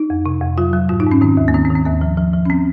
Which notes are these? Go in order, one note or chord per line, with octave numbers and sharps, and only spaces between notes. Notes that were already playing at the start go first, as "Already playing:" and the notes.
Already playing: D#4
F2
C3
F2
F#3 F4
F#3
G#2 F4
D#4
G#2
C#4
D#3 C4
D#2
A#3
D#3 C4
C4
D#3
C4
D#2 A#3
F3
F3
F3
C#4
C4